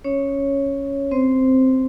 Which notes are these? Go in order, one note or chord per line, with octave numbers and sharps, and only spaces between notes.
C#4 C#5
C4 C5